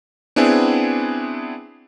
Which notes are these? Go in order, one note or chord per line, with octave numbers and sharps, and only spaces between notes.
B3 C4 D4 E4 G#4 G#5